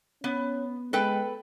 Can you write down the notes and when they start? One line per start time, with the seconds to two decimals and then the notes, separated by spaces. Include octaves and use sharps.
0.24 B3 C#4
0.93 G#3 A4 B4 G5